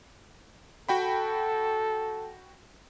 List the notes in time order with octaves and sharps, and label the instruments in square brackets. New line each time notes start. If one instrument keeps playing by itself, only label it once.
[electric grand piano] F#4 G5 B5 [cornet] A4